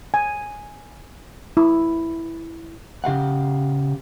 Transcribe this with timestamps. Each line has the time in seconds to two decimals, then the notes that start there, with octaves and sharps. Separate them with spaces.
0.14 G#5
1.57 E4
3.04 C#3 G4 F5 F#5